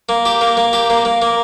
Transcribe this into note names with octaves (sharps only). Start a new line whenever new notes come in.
A#3
G4
A#3
A#3
G4
A#3
A#3
A#3